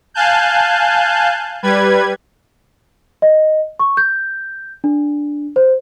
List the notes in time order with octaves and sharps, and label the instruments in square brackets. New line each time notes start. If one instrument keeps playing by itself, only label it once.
[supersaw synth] F5 G#5 A5 F#6 G6
G3 B4 G#6
[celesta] D#5
C#6
G6
D4
C5